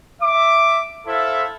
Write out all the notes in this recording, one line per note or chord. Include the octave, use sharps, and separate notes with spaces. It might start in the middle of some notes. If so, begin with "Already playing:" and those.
E5 D6
E4 A4 C5 E5 F5